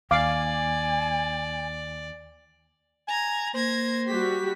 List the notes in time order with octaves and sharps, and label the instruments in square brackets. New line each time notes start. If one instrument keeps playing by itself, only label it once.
[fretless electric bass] D#2 [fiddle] D5 [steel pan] F5 D6 [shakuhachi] G#5
[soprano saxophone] G#5 [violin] A#5 G#6
[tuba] A#3 [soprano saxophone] C5 [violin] G#6 A#6
[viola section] G3 F#4 G4 [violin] B6